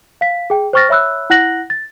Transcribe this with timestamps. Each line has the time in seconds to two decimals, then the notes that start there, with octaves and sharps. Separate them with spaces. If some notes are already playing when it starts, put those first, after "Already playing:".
0.21 F5 B6
0.50 G#4 G5
0.73 C5 G5 C#6 F6 A6 A#6
0.89 C#5 E5 B5 E6 F#6
1.30 E4 F#5 F#6 A#6 F#7
1.70 A6